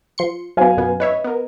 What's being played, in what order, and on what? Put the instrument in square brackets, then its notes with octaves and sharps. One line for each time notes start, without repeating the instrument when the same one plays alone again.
[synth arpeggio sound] F3 C6 C#7
[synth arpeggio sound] F#3 B3 [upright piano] C5 F5 G#5
[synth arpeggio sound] F#2 B2 B3
[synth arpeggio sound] B4 C#5 E5 [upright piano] D#5
[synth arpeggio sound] B3 A#4